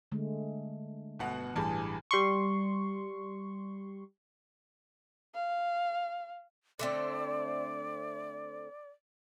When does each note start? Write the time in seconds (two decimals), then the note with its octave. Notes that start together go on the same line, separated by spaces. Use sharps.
0.12 D3 G#3 A3
1.19 G1 B2 F#5
1.56 A1 G2 E3 G3 G#4
2.11 G3 C6 C#6
5.34 F5
6.79 D3 A3 C4 D5